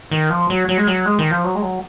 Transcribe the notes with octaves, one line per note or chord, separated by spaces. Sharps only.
D#3
F3
F#3
F#3
G#3
F#3
G#3
D#3
F3
F#3
G#3
F#3